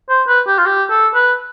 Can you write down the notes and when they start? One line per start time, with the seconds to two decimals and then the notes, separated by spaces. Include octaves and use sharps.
0.09 C5
0.28 B4
0.47 G4
0.58 F4
0.66 G4
0.90 A4
1.15 B4